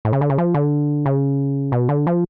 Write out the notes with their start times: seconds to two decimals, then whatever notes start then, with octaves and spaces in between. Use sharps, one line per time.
0.05 A2
0.13 C#3
0.21 D3
0.30 C#3
0.38 F3
0.54 D3
1.06 C#3
1.72 B2
1.89 D3
2.07 F3